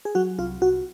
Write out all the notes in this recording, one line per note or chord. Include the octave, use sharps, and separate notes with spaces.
G#4
F#3 F#4
C2 F4
C2 F#4